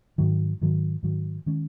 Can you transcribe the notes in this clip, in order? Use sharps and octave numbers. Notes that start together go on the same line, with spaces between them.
G#2 D#3 F#3
G#2 D#3 F#3
G#2 D#3 F#3
D#3 G#3 C#4